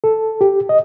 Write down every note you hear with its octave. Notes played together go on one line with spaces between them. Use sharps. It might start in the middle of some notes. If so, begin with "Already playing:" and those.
A4
G4
D#5